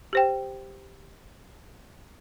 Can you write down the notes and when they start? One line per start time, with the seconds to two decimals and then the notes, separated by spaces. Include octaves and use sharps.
0.13 G4 C5 G5